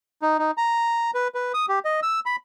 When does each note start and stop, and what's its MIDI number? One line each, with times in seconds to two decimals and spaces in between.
0.22 0.38 63
0.39 0.51 63
0.57 1.11 82
1.14 1.28 71
1.35 1.52 71
1.54 1.66 87
1.69 1.79 67
1.85 2.00 75
2.03 2.20 88
2.26 2.36 83